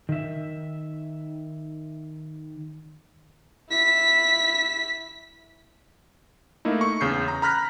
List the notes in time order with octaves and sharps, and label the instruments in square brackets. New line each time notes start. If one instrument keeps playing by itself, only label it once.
[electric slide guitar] D#3 E5
[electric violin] E4 B6
[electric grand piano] A3 A#3 D#4 E4
C#6
E2 C#3 G6 C7
A#5
A#5 B5 F6 F#6 A#6 B6